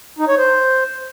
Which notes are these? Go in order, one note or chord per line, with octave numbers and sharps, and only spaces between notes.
D#4
C#5
C5